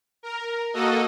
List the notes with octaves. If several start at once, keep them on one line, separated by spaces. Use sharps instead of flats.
A#4
A#3 F#4 A4 D#5